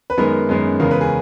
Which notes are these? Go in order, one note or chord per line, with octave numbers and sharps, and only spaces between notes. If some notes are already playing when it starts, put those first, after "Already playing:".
B4
F#2 D#3 G#3 B3 A#4
F#2 D#3 G#3 B3
E2 C#3 G#3 B3 A#4
B4
G#4